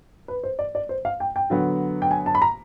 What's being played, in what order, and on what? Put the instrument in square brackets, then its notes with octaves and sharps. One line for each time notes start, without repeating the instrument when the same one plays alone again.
[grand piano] B4
C5
D5
D5
C5
F5
G5
G5
[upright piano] D3 F#3 B3
[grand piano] G5
G#5
A5
B5
A#5